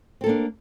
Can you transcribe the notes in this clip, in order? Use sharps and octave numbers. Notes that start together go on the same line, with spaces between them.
A#3 C4 D4 A4